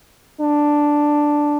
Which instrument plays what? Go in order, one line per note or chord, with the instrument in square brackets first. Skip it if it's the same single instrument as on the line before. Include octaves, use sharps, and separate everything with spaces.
[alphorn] D4